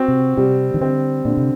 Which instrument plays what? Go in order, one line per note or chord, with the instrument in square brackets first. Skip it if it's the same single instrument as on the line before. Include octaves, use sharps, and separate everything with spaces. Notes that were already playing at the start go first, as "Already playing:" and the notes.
Already playing: [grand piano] C4 F#4
[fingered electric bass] C3
[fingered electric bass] C3 [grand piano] G3
[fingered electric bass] D#3
[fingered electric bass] D3 [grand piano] C4
[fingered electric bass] A#2 [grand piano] D3
[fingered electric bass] C3